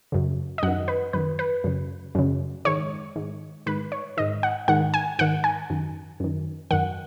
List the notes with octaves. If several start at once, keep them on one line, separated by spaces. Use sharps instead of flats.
F#2 C#3
D#5
F#2 D#3 F#5
B4
F#2 D#3 B4
B4
F#2 C#3
F#2 C#3
G#2 D#3 C#5
G#2 D#3
G#2 D#3 B4
C#5
G#2 D#3 D#5
F#5
G#2 D#3 F#5
G#5
G#2 D#3 F#5
G#5
F#2 D#3
F#2 D#3
F#2 D#3 F#5